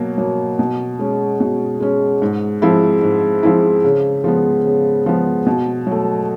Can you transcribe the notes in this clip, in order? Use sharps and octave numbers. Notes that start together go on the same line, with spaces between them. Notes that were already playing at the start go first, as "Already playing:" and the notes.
Already playing: B2 F#3 A#3
F#3 A#3
B2
G#3 C#4
B2
G#3 C#4
G#2
F3 G#3 C4 E4
G#2
F3 G#3 C4 E4
C#3
F3 G#3 B3
C#3
F3 G#3 B3
B2
F#3 A3